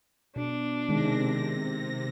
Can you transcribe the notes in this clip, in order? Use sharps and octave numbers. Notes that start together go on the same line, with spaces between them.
B2 D4
C3 D#3 G#3 A#6